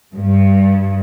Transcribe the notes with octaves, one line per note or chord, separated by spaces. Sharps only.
G2